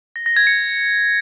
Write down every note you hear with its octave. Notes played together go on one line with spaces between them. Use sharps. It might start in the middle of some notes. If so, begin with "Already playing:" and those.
A#6
A#6
G#6
C#7